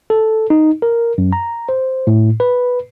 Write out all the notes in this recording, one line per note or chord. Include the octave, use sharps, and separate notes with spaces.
A4
D#4
A#4
F#2
A#5
C5
A2
B4